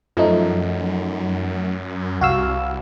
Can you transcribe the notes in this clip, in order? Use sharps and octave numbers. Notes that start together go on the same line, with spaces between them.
F#2 F3 A3 D#4
C2 F#4 F5 E6